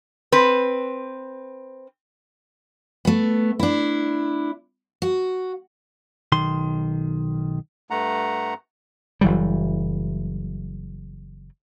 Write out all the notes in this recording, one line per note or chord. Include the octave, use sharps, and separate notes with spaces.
C4 B4
A3 B3
D4 E4
F#4
B1 D#3 C6
G2 A3 F#5 A#5
F#1 E3 F#3 G3